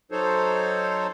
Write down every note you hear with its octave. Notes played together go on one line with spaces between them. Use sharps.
F#3 D#4 A4 C5 C#5